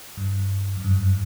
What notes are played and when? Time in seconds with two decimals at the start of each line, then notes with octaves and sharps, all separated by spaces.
0.17 G2
0.77 F#2
0.84 G2
0.91 F#2